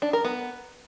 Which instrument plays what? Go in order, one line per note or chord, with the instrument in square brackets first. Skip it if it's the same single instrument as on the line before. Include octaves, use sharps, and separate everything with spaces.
[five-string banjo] D4
A#4
B3